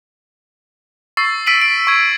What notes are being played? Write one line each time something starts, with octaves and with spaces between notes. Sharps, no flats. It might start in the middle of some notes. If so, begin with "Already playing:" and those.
C#6 E6 A6 C7
E6 B6 D7 D#7 F#7
D7
C#6 G#6